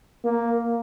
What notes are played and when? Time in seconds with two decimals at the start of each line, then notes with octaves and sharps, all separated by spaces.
0.25 A#3